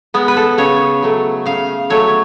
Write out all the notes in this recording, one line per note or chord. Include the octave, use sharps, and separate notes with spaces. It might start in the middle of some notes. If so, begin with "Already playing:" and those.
G#3 B3
B4
A4
C#3 C#5
F#3 A3
C#3 F5
F#3 A3 C#5